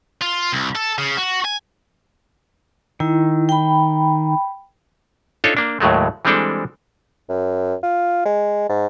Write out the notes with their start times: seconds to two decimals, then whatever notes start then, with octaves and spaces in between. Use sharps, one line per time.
0.22 F4
0.53 C2
0.75 A4
0.98 C#3
1.17 F#4
1.45 G#5
3.00 D#3 E4
3.49 G5 B5
5.44 D4 D#4 F4 A4 C#5
5.57 A#3 D4
5.80 D#2 A2 F#3 G#3 A3
6.25 E3 G3 G#3 C4 D4 A4
7.29 F#2
7.83 F4
8.25 G#3
8.69 G#2